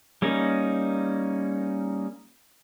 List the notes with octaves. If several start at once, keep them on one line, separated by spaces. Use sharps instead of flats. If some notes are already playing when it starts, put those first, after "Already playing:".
G3 A#3 C#4 D#4